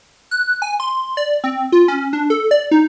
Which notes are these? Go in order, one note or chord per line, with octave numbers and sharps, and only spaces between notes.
F#6
G#5
C6
D5
C4
F4
C#4
D4
A4
D5
D#4